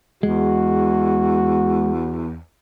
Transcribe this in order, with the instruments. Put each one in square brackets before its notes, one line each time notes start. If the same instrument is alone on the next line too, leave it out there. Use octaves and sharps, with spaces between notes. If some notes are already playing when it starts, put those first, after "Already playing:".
[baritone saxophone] E2 [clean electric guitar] G#3 [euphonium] F#4